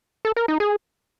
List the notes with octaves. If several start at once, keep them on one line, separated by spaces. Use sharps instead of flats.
A4
A#4
D#4
G#4